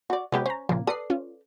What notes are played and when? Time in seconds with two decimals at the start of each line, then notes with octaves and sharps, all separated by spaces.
0.10 F#4 D5
0.32 C3 F#3 G#3 B3 C#4 G4
0.46 C#4 C5 A#5
0.69 A#2 C#3 F3 A#3
0.87 A4 B4 D5 D#6 C7
1.10 C#4 F4